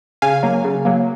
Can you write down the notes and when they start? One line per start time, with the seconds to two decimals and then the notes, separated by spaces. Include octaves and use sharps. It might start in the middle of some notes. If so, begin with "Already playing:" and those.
0.22 C#3 F5 G#5
0.43 F#3 A#3
0.64 C#3
0.85 F#3 A#3